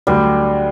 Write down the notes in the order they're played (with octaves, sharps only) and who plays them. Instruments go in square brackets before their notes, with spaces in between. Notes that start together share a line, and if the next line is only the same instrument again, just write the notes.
[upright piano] D2 D3 F#3 [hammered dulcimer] G3